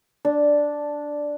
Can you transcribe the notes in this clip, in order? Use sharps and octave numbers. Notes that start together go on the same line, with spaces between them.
D4